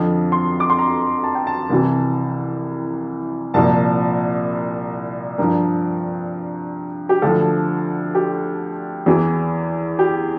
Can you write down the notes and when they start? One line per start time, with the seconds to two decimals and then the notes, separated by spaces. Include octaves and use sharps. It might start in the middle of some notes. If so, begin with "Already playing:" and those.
Already playing: F2 D3 F3
0.32 C6
0.60 D6
0.70 C6
0.79 A#5
1.24 A5
1.35 G5
1.47 A5
1.70 C2 C3 E3
3.54 C2 A#2 F3 A5
5.38 G2 F3 A#4
7.09 G4
7.22 D2 D3 F3 A4
8.15 G4
9.06 E2 E3
9.99 G4